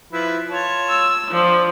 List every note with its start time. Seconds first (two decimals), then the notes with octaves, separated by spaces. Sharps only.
0.12 F3 E4 B4
0.50 F4 C#5 A5
0.88 E6
1.31 F3 D4